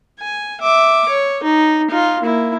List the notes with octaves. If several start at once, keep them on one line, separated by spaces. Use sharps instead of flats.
G#5
E5 D6
C#5
D#4
D#4 F4
A#3 E4